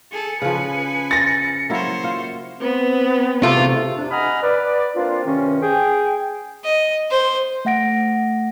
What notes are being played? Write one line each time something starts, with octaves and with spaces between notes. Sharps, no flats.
G#4 A4 C#7
C#3 F3 B4 G#5
A6 A#6
F#3 A#3 E4 C5 C#5
F4
B3 C4
E2 C3 A3 F4
F2 C3 D4
D#5 F#5 G#5 A#5 B5 F6
B4 D5
A#3 C4 D4 F4
G2 C3 D#3 C#4
G#4 G5
D#5
C5
A3 E5 F#5 A#6 D7